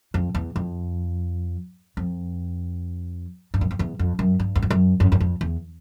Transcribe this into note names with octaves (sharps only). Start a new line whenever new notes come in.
F2
E2
F2
F2
G2
F#2
F2
E2
F2
F#2
G2
E2
F2
F#2
F#2
F#2
F2
E2